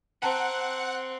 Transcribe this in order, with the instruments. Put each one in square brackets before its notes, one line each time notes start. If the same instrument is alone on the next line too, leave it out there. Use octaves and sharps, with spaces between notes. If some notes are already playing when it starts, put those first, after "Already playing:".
[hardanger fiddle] C4 [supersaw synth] F#5 [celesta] G5 A5 A#5